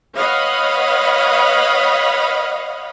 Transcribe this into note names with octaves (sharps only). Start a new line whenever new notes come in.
B4 C#5 D#5 F5 F#5 B5